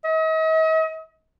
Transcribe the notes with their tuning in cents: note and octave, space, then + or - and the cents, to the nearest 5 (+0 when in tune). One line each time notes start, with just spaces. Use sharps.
D#5 +45